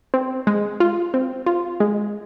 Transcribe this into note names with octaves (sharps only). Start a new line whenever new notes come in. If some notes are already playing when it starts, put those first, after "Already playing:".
C4
G#3
F4
C4
F4
G#3